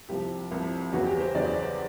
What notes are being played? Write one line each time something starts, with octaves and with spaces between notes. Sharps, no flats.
C2 C3 F3 G4
C2 C3 F3
E2 C#3 F#3 B3 F#4
G4
C5
E2 C#3 F#3 B3 D5